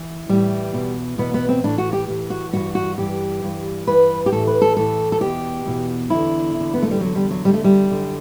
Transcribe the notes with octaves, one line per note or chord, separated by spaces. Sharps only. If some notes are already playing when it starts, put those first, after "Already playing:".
Already playing: E3
A2 E3 G3
E2 B2
E2 B2 B3
B3
C4
A2 E3 D4
F#4
G4
A2 E3
F#4
G2 E3 F#4
F#4
G2 E3 G4
G2 E3
G2 E3 B4
G4
A2 E3 A4
B4
A4
A2 E3 A4
A4
E2 B2 G4
E2 B2
E2 D3 E4
E2
D3
B3
A3
G3
E2 D3 F#3
G3
F#3
E2 D3 G3
A3
G3
F#2 D3